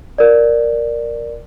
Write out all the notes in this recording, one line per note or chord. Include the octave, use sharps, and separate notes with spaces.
A#4 D5